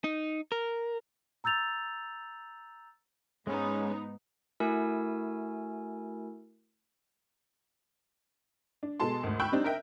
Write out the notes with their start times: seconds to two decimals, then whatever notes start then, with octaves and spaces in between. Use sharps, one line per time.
0.04 D#4
0.52 A#4
1.44 A#5 E6 G6 A6 F7
3.47 G#2 G#3 B3 C#4 D#4
4.60 A3 E4 F#4 A#4 G#5 E6
8.83 D4
9.00 B2 G#3 G#4 A4 A5 C6
9.23 G#1 D2
9.40 G5 B5 C#6 E6 F#6 G6
9.52 G3 C4 D4 D#4
9.64 A#4 D#5 E5 G5